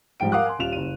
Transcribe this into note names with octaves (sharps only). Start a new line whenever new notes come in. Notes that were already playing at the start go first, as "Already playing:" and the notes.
G#2 F3 G3 G5 D7
A#4 F5 F#5 D6 D#6 F#6
G#5 C6
D#1 F4 E7 F7
F#1 D#7